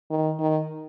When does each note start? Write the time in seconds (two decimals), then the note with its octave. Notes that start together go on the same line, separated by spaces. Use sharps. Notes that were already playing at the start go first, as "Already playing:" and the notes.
0.10 D#3
0.39 D#3